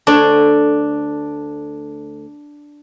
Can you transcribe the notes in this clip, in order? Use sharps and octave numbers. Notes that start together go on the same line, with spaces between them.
D2 D4 A4 C#5